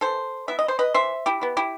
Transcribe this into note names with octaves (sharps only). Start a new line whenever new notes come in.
E3 A4 C5
B3 E4 E5
D#5
C5
B4 D#5
E3 C5 E5
E4 G4
B3 E4
E4 G4